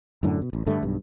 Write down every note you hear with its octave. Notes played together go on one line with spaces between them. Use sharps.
F#2 A2 D3
B2
A1
G2 D3 A3
B1 G2